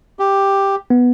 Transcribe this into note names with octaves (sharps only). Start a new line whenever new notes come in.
G4
B3